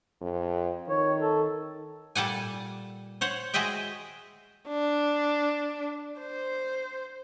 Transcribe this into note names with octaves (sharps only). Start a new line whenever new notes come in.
F2
D#3 C#5
A4
A#2 G3 A4 F#5 G#5
C5 C#5 F#5
G#3 F#4 G#4 D#5 E5 G5
D4
C5